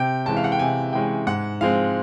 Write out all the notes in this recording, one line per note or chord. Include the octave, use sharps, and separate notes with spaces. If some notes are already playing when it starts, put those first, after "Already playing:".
Already playing: C3 G5
E3 G#3 C#4 A5
F5
F#5
G5
C3 G#5
E3 G#3 C#4 G5
G#2 F#5
F3 G#3 C4 F5